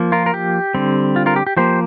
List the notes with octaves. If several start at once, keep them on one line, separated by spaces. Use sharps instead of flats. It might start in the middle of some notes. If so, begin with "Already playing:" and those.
Already playing: F3 A#3
F4 A#4
A#4
G4
D3 G3 C4
F4
F4 A#4
G4
G4
F3 A#3 G4 C5